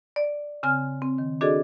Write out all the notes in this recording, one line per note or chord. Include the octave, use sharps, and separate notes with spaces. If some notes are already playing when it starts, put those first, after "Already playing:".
D5
C#3 C4 G#5 F6
C4
D#3
D4 F#4 G#4 A4 D5 D#5